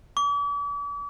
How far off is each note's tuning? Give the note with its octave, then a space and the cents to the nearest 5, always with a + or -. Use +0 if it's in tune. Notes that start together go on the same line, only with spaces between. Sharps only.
D6 -45